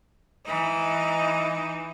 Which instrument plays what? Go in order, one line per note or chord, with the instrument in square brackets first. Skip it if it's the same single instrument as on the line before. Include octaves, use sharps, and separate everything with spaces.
[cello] E3 D#4